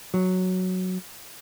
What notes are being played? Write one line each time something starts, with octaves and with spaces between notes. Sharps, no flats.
F#3